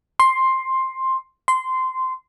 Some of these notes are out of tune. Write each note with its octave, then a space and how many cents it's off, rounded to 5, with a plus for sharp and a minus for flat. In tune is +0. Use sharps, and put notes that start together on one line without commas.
C6 +10
C6 -15